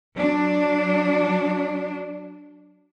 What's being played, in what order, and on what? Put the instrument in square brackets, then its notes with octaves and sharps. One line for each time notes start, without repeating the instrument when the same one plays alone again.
[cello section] F#3 D4